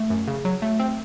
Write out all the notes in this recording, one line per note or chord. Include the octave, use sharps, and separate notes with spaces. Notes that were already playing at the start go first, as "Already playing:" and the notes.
Already playing: A3
F#2
C#3
F#3
A3
C4